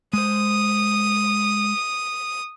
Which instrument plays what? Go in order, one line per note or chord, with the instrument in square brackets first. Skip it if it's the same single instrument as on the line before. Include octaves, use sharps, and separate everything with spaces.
[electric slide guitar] G#3 C5 [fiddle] D#6